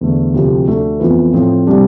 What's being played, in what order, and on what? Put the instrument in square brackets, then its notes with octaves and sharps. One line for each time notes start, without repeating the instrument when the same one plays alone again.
[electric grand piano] E2 D3 A3
D2 C3 F3 C4 G4
D2 D3 A3
F2 E3 B3 F4 B4
A2 F3 C4
C3 G3 D4 G4